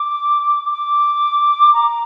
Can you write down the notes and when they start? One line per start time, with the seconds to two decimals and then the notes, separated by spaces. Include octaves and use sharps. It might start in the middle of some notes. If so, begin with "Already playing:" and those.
Already playing: D6
0.70 D6
1.73 A#5